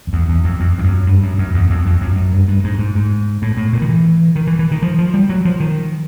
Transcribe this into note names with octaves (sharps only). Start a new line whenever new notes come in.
F2
E2
E2
F2
F2
F2
F#2
G2
F#2
F#2
E2
F2
F2
F#2
F#2
G2
G2
G#2
G#2
G#2
A2
A2
A#2
D#3
E3
D#3
E3
E3
D#3
F3
F3
G3
F#3
F3
D#3